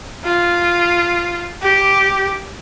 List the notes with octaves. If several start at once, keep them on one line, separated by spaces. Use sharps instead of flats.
F4
G4